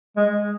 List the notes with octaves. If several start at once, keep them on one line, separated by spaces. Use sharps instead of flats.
G#3